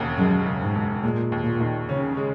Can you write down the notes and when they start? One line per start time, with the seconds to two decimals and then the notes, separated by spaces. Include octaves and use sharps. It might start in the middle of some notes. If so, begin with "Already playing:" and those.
Already playing: E1 D#2 C#3
0.18 F#2 G#3
0.46 C#3
0.61 G#2
0.75 E1
1.04 A#2 G#3
1.32 D#2
1.46 A#2
1.60 D#3
1.89 C#3 C#4
2.17 G#3